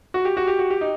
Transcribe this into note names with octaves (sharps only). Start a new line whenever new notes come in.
F#4
G4
F#4
G4
F#4
G4
D#4